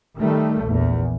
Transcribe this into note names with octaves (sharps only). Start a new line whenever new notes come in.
D#3 G3 A3
A#1 E2